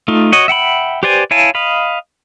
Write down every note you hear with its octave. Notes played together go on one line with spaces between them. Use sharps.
A3 D#4 F4
F#4 C#5 D#5
E5 F#5 G5 B5
G4 B4 C5 D5 G#5
E4 C#5 F5 G#5 A5
D#5 F5 B5